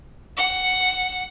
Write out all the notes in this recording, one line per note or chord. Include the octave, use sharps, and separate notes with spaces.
F#5